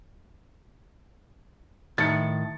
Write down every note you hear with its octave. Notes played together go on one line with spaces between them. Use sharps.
A2 D#3 A6 C#7